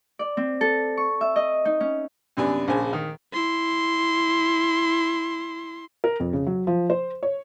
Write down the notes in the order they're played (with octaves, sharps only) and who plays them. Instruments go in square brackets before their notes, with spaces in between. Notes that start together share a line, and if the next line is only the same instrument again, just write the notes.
[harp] D5
C4
A4
C#6
E5
D#5
D#4
C#4
[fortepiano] F#2 C3 B3 D4 G#5
A#1 C#3 C5 G#5
D#3
[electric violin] E4 C6
[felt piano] A#4
F2
C#3
F#3
F3
C5
C#5